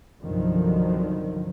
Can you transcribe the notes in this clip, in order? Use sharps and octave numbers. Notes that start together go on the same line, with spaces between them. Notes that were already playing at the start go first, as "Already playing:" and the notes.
C2 G2 D3 D#3 F3 F#3